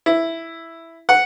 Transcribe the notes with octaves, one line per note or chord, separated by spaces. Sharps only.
E4
F#5